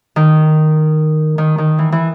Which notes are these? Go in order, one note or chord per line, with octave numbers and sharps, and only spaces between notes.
D#3
D#3
D#3
E3
E3